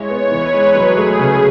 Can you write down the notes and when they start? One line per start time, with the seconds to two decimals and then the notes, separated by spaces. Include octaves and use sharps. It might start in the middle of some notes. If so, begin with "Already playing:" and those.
Already playing: G#3 E4 C#5
0.10 B3
0.31 E3 B4
0.54 G#3
0.75 F#3 G#4
0.97 A3
1.19 C#3